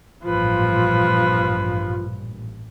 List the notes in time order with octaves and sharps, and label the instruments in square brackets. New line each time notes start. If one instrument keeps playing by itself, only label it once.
[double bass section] A1 G2 A#2 [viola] F3 B4 [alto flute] F4